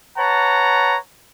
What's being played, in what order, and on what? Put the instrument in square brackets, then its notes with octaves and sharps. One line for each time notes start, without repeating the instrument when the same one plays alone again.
[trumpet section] B4 C#5 F#5 A5 A#5